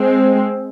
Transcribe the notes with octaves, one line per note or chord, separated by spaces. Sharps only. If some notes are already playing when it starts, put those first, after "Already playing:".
Already playing: G#3 C4